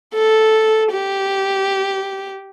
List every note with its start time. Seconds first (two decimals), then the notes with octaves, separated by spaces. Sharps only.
0.14 A4
0.92 G4